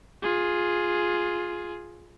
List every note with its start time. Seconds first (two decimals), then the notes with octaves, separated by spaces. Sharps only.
0.22 F4 G#4